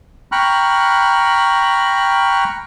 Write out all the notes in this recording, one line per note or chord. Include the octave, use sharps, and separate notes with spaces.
G5 A#5 B5 C#6 F6 F#6